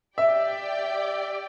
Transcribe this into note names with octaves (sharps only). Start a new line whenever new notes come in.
G4 D5 E5 G5